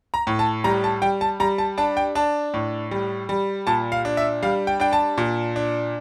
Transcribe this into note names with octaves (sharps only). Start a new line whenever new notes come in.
A#5
A2
A5
G3 A#5
A5
G3 G5
A5
G3 A#5
A5
D4 A5
G5
D4 A5
A2
G3
G3
A#2 A5
F5
D4
E5
G3 F5
G5
D4 G5
A5
A#2
D4